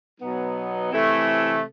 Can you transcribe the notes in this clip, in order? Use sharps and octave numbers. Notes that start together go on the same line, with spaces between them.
B2 F#3 B3 D#4
C3 E3 A3